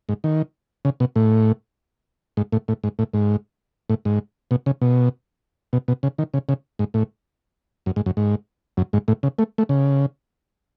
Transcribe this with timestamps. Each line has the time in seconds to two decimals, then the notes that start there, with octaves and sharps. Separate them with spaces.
0.09 G#2
0.24 D#3
0.85 C#3
1.00 B2
1.16 A2
2.37 G#2
2.52 A2
2.68 A2
2.84 G#2
2.99 A2
3.14 G#2
3.90 A2
4.05 G#2
4.51 B2
4.66 C#3
4.81 B2
5.73 B2
5.88 B2
6.03 C#3
6.18 D#3
6.34 C#3
6.49 C#3
6.79 G#2
6.94 A2
7.86 F#2
7.96 G#2
8.06 F#2
8.17 G#2
8.77 F#2
8.93 G#2
9.08 A2
9.23 C#3
9.39 A3
9.58 A3
9.69 C#3